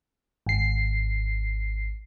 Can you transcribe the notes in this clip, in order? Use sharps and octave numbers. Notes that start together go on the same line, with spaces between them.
G#1 C7